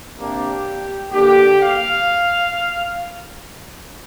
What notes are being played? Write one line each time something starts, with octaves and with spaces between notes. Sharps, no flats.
C3 A#3 D4 G4
D3 A#3 D4 G4
F5